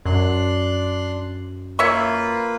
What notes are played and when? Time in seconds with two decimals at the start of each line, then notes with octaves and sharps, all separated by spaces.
0.05 F#2 D4 C6 F#6
1.79 A#3 F4 B4 C#5 E5 C#6